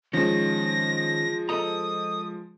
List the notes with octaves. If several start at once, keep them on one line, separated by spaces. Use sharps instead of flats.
D#3 F3 G#3 C#4 A#6
A4 D#5 A#5 D#6